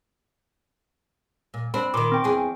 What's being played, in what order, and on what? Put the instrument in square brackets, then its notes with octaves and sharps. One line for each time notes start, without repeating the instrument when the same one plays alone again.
[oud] A#2
[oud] C4 D4 [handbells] B5
[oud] A#2 D#3 [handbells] C6 D6
[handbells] C4 G5
[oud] E2 G#4